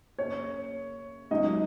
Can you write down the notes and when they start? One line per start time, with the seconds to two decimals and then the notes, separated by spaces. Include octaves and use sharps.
0.18 F#2 C#3 A#3 C#5
1.31 C#2 C#3 F#3 C#4 D#4 D#5